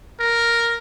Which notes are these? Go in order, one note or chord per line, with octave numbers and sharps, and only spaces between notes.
A#4